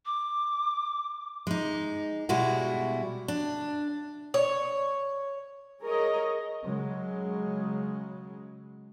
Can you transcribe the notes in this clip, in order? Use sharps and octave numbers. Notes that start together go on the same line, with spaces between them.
D6
G#3 D#4
B2 G3 G#3 E4 F#4
D4
C#5
G#4 A#4 C#5 D#5
C#3 F#3 G#3